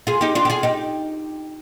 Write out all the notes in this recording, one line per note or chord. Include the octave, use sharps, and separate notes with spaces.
F4 G#4
D#4 G4
D4 F4
G4
F4 G#4
D#4 G4